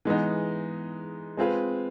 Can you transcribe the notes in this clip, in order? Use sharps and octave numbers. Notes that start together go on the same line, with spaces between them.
E3 G#3 B3 D#4
G#3 C4 F4 G#4 B4